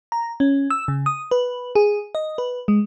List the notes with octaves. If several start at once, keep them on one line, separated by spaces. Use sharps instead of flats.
A#5
C#4
E6
C#3
D#6
B4
G#4
D#5
B4
G#3